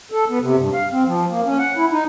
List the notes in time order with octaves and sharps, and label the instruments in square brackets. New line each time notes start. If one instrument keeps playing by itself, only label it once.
[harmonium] A4
B3
C3
G2
F5
C4
F3
A#3
C#4
F#5
E4
D#4